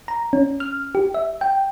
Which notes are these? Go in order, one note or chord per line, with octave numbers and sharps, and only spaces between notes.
A#5
C#4
F6
G4
E5
G5